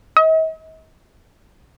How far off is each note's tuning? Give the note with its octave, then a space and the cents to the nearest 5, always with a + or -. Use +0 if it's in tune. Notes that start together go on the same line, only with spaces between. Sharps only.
D#5 +45